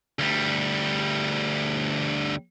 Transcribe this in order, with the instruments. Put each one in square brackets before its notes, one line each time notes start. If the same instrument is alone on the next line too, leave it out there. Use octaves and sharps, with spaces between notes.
[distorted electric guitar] D2 G3